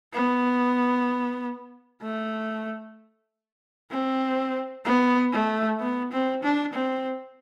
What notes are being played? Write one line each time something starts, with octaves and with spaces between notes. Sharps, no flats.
B3
A3
C4
B3
A3
B3
C4
D4
C4